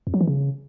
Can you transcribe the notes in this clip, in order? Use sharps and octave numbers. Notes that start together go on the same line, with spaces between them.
F2
F#3
E3
C#3